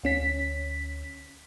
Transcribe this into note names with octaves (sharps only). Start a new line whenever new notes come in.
D2 C#4 B6